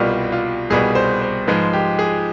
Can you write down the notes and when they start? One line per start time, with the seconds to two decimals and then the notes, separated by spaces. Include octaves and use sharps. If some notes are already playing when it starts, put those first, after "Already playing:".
Already playing: C2 B2 G3 F4
0.32 F4
0.70 C2 B2 G3 G#4
0.95 C5
1.22 C5
1.47 G#2 F3 G#3 B4
1.73 G4
1.99 G#4